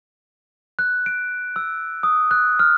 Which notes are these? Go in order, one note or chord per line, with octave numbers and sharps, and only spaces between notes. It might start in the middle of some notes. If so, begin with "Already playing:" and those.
F#6
D7
E6
D#6
F#6
F6